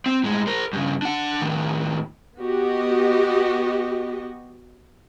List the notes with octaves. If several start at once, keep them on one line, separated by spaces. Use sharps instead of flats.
C4
A2 G#3
A#4 C5
G2 C#3
D4 F#5
A2 D#3
B3 F#4 G4 D#5